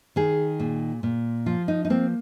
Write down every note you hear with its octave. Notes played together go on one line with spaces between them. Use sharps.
D#3 G#4
A#2
A#2
F3 F4
D#4
D#4
A#3 C4